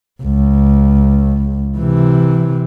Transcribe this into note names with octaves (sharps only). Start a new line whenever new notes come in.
C#2
C3 E3